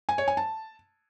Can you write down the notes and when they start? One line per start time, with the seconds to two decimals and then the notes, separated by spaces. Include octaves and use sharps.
0.09 G#5
0.18 C#5
0.28 G#5
0.37 A5